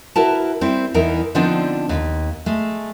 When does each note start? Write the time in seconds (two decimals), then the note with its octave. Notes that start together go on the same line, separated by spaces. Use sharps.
0.16 E4 F#4 A#4 B4 A5
0.61 G3 C4 E4 G4
0.94 E2 E3 D#4 A#4
1.35 D3 F3 B3 C4 D4 D#4
1.89 D#2
2.46 G#3 A3